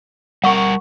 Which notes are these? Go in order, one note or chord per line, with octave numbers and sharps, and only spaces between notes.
G3 A#4 F#5 C#6